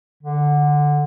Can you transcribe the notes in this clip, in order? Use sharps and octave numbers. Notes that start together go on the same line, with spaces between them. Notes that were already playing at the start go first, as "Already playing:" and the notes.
D3